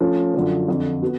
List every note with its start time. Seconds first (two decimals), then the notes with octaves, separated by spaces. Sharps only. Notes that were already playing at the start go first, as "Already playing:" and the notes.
0.01 F3 A3 C#4
0.34 F#2 D3 F3
0.68 F2 D3 F3
1.02 B3 F#4